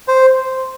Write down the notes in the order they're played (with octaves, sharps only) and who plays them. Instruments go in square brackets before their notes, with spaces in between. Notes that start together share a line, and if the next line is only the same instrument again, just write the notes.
[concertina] C5